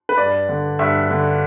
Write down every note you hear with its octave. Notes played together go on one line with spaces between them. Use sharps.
B4
G2 D5
D3
G2 E5
D3